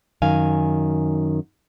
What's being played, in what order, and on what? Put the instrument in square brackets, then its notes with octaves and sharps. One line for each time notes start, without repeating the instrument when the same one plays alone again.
[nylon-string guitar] F#2 D#3 F5 G#5